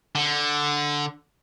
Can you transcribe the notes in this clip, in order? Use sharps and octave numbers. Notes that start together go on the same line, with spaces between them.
D3